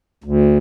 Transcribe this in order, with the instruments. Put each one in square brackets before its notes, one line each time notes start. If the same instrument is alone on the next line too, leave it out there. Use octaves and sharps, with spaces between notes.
[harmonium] D2